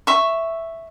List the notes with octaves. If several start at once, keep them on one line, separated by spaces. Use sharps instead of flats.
E5 C#6